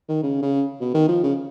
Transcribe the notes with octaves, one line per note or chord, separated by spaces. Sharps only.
D#3
C#3
C#3
B2
D#3
F3
C#3